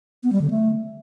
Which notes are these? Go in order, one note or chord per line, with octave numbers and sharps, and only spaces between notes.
B3
G3
D3
A3